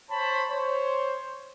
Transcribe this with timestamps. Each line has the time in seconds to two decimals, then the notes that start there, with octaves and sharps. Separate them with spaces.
0.10 C5 C#5 A5 B5
0.50 C5 C#5